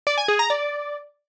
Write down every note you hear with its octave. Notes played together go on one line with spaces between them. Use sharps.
D5
G#5
G#4
A#5
D5